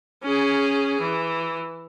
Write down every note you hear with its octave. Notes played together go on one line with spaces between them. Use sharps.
C#4 G#4
E3